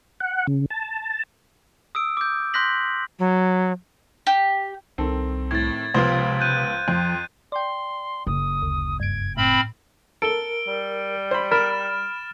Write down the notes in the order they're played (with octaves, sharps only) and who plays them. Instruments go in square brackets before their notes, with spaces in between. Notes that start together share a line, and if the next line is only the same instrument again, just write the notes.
[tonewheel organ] F#5
C#3
A5
[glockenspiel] D#6 E6 D7
D6 G6
C6 F#6 G6 A#6 B6 F#7
[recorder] F#3
[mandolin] G4
[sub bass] C2 [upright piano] D#3 C4 A4
[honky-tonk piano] A2 [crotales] G#6 A6
[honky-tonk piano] C#2 F3 B3 [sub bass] C3 [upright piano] C5 F5
[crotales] F#6 G6 D#7
[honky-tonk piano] F2 [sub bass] F3
[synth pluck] D5 G5 [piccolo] C6
[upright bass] F#1 [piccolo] D#6
[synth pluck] D2
[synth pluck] G2 D7 [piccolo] G#6
[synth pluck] A2 [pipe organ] C4 B5 [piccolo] F6
[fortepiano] A4 [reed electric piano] A#4 [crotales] D7 G7
[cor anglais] G3
[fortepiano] C5 B5
[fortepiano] A#4 [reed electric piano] B5 [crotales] F6 A6 E7